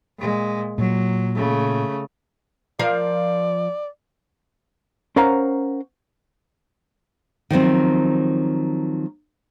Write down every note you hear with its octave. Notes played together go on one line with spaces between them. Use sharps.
A#2 G#3
A#2 F#3
C#3 A3
F3 A#4 D5 F5
C#4 A#4 C5 F5 F#5 A#5
D#3 F3 F#3 C4